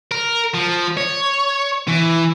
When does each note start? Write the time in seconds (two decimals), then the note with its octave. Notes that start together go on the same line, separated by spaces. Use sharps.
0.12 A#4
0.55 F3
0.97 C#5
1.88 E3